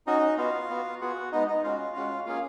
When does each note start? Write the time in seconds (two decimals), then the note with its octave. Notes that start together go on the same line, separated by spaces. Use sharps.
0.07 C#4 D#4 F#4 D#5
0.38 B3 F4 F#4 F5
0.70 B3 F#4
1.01 B3 F4 F#4 G#4 F#5
1.32 G#3 B3 D#4 D#5
1.48 D#4 D#5
1.64 G#3 C#4 F4 F#4 F5
1.96 G#3 C#4 F#4
2.26 A#3 C#4 F4 G#4 F5